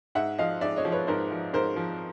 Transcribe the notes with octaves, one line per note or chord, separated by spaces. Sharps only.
G#2 E5 F#5
F3 D#5 F5
G#2 D5 E5
C#5 D#5
F3
B4 C#5
G#2 A#4 C5
F3
G#2 A#4 C5
F3